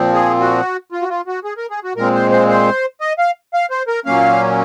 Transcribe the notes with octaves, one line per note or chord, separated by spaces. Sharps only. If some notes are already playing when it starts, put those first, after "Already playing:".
Already playing: A#2 F3 C4
G#4
F#4
F4
F#4
F4
F#4
G#4
A#4
G#4
F#4
A#2 G#3 C4 A#4
C5
C5
C5
D#5
F5
F5
C5
A#4
A#2 F#3 A#3 C#4 F5